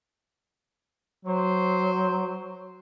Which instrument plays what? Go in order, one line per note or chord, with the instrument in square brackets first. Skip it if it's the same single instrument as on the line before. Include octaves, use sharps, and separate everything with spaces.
[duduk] F#3 [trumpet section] C5